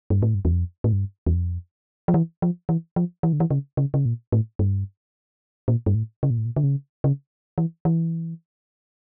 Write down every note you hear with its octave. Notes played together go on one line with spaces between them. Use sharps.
G2
A2
G2
E2
F2
A2
G2
E2
F2
F3
E3
F3
E3
F3
E3
D3
E3
C#3
C#3
C#3
A#2
A2
G2
A#2
G2
A2
C#3
A#2
A2
A#2
D3
C#3
C#3
E3
E3